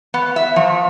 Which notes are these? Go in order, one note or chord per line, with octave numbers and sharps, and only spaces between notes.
B3
E5
F3